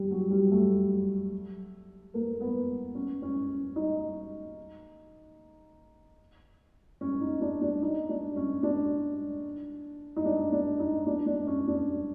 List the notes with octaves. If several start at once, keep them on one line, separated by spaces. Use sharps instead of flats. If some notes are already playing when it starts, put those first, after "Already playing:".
Already playing: G3
F#3
G3
A3
A#3
B3
C#4
C#4
D#4
C#4
D#4
D4
D4
D#4
D4
C#4
D4
D#4
D4
D4
D#4
D4
D4
C#4
D4